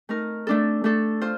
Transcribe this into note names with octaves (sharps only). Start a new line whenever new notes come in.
A3 D#4 A#4
A3 D4 A4
A3 D4 A4
F4 C5